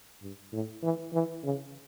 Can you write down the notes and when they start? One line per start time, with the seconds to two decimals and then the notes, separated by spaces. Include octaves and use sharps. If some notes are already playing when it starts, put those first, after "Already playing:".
0.22 G2
0.53 A2
0.83 E3
1.13 E3
1.44 C#3